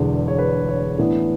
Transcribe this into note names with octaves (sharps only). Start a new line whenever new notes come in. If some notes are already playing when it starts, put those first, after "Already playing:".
Already playing: E1 E2 D3
C#5
B4
C#5
A2 E3 B3 D4